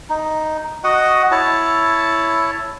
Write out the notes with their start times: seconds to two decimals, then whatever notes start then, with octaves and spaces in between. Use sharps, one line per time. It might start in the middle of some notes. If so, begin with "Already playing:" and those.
0.10 D#4
0.84 F#4 D#5 F#5
1.31 E4 C#5 A5